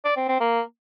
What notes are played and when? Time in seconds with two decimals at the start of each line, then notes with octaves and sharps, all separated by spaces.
0.05 D5
0.17 C4
0.28 C4
0.40 A#3